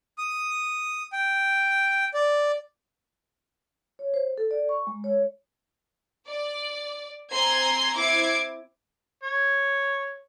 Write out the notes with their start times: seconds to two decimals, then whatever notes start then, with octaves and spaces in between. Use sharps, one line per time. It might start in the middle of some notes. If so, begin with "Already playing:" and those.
0.18 D#6
1.13 G5
2.14 D5
3.99 C#5
4.14 C5
4.38 A4
4.51 D5
4.69 C#6
4.87 G#3
5.04 C#5
6.28 D5
7.33 C4 G#5 A#5 C6 G#6
7.96 C4 E4 D6 G#6 C7 D7
9.23 C#5